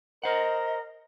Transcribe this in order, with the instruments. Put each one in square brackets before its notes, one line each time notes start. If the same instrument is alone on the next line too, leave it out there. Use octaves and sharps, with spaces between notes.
[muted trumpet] A#4 [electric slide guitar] C5 F#5 [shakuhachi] D#5